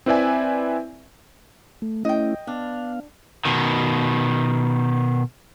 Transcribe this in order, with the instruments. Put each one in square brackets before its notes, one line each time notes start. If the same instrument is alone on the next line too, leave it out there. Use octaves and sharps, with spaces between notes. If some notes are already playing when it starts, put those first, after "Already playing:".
[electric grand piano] C4 E4 B4 D5 E5 G#5
[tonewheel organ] A3
[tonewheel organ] A3 C#4 E4 [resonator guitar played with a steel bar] D#5 G5
[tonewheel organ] B3 F5 [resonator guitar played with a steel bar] D4
[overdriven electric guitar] B2 D#3